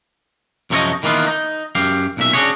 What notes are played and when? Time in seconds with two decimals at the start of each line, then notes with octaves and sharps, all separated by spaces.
0.70 F#2 C3 F3 A4 C#5 D#5
1.03 D#3 E3 A#3 B3 F4
1.27 D#4
1.75 F#2 G4 F5
2.17 B1 A#2 E5
2.33 C#4 D4 F4 F#4 G#4 C#5